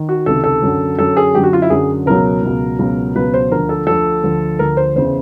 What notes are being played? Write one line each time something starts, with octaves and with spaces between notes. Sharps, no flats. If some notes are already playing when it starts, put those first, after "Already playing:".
Already playing: D#3
F#4
C#2 C3 D#3 A4
A4
F#2 D3 F#3
F#2 D3 F#3 A4
G#4
F#2 D3 F#3 G4
F#4
F4
E4
F#2 D3 F#3 G#4
C#2 B2 F#3 A#4
C#2 B2 F#3
C#2 B2 F#3
C#2 B2 F#3 B4
C5
D2 D3 F3 A#4
A4
D2 D3 F3 A4
D2 D3 F3
D2 D3 F3 A#4
C5
E2 C#3 E3 C5